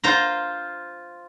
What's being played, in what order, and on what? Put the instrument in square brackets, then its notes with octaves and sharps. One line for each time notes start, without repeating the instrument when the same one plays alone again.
[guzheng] F4 C5 A#5 C6